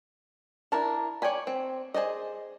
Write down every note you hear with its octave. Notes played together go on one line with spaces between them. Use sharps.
D4 E4 A#4 A5
C#5 D5 G5 G#5 B5
C4
G#4 C5 D5 D#5